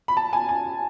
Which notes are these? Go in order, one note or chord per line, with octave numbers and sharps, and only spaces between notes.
B5
A5
G#5
G#5